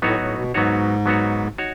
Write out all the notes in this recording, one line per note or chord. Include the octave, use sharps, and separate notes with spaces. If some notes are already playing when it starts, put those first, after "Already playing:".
A2 F#3 B3 D#4 F#4 C#5
A2
B2
G#2 F#3 B3 D#4 F#4 C#5
F#3 B3 D#4 F#4 C#5
D#4 F#4 C#5